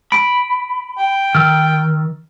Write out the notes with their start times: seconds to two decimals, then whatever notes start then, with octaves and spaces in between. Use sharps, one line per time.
0.12 B5 D7
0.98 G5
1.35 D#3 E6 F6